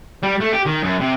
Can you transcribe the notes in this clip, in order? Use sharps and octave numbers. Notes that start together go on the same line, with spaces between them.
G3
A3
G4
D#3
F#2
C3